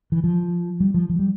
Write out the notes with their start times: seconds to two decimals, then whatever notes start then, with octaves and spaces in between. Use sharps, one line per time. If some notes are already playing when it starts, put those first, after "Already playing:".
0.12 E3
0.24 F3
0.80 G3
0.94 F3
1.09 F3
1.19 G3